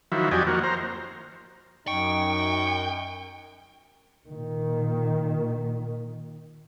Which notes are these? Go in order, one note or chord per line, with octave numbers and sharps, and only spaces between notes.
D#3 F3 F#3 E4
F2 F#3 G4 D5 D#5 G#5
F3 A#3 F#4
C5 A#5
F#2 D#4 G5 C#6
A#2 D#3